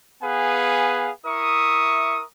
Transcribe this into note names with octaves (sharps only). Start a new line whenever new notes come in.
B3 G#4 B4 F5 F#5 G#5
E4 A#4 E5 C#6 D#6